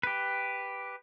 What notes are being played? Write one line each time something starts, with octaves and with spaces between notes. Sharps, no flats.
G4 B4